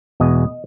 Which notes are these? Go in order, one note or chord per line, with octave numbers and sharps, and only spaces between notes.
E2 B2 G#3 D#5